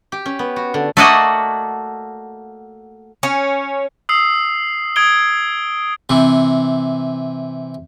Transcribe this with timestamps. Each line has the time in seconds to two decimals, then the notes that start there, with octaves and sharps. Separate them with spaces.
0.12 G4
0.26 C#4
0.39 B3
0.56 F#4
0.74 D3
0.97 A3 A#3 F#4 D5 D#5 F#5
3.23 C#4
4.09 D#6 E6 C7
4.96 D#6 G#6 D7 G7
6.10 C3 E3